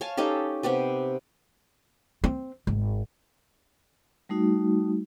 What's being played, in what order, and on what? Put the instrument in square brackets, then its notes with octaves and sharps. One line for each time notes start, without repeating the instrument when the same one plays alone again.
[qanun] C#5 F5 G#5 A5
C#4 D#4 G4 A4
C3 B3 G4 B4
[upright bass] C4
G#1
[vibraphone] G3 A3 D#4 F#4